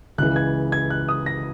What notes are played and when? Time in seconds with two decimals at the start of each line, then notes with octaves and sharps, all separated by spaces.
0.18 C#2 C#3 E3 F#6
0.36 G#6
0.72 G#6
0.90 F#6
1.09 D#6
1.26 A#6